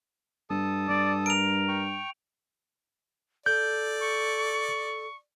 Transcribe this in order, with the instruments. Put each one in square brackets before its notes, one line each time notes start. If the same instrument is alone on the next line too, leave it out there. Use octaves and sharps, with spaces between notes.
[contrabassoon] G2 [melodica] A4 A5 D#6
[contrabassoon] G2 [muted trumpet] D5
[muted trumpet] A#4 [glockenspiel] D7 F7
[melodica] G5 C#6
[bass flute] A4 [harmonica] D5 [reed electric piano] G6
[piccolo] C#6